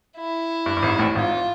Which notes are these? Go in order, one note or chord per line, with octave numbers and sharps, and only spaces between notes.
E4
G2
G2
G#1 G#2
A1 A2
G#1 G#2 F4